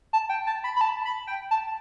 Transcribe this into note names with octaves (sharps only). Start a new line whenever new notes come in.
A5
G5
A5
B5
B5
A5
B5
G5
A5